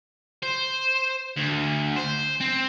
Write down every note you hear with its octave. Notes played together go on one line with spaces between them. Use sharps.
C5
D2
C5
C4